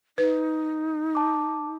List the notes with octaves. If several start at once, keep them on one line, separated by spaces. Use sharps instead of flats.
D#4 B4
A5 D6